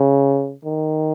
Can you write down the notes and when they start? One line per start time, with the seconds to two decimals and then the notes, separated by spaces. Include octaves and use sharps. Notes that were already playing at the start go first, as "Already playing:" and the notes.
Already playing: C#3
0.65 D#3